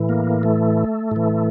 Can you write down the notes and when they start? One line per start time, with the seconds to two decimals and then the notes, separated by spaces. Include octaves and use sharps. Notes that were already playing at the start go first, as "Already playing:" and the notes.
Already playing: A2 E3
0.09 A#3
0.43 A3
1.11 A2 E3